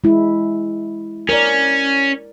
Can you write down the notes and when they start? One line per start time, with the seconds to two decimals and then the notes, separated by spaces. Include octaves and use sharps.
0.04 G#3 E4
1.29 C#4 A#4 D5